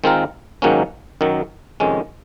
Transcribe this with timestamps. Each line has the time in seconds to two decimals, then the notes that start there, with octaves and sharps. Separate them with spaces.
0.04 D#3 G#3 C4 F4 A#4
0.62 G#2 D#3 F#3 A#3 C#4
1.21 F#2 D#3 F#3
1.80 F2 C3 D#3 G#3 C#4